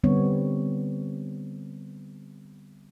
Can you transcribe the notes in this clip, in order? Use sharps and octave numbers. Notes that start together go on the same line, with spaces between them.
D3 G3 B3 C4 C#5